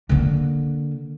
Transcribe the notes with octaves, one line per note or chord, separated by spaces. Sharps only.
D3 A#3